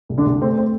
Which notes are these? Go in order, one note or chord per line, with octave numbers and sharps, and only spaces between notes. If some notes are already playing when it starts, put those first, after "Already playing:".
C2
D3 D4
C2
A3 C4
C4